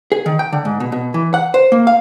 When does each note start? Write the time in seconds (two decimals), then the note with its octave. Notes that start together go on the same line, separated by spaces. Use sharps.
0.12 G#4
0.26 D#3
0.39 G5
0.53 D3
0.65 G#2
0.80 B2
0.92 B2
1.14 E3
1.34 F#5
1.54 C5
1.72 A#3
1.87 F5